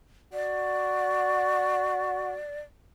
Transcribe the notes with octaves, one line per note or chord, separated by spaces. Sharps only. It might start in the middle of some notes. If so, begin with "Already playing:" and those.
F#4 D5